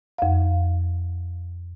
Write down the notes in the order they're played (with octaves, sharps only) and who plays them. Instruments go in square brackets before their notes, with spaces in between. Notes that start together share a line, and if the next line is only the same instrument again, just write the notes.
[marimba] F2 F5